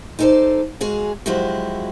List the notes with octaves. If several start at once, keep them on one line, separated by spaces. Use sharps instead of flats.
D#4 E4 A4 A#4 C5 D5
G#3 F#4 G#4 F5
F3 F#3 G#3 E4 F#4 G4